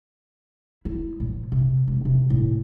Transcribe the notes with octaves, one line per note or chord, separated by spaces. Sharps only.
E4
A#2 F3
C3
E1
C3
A2 C#4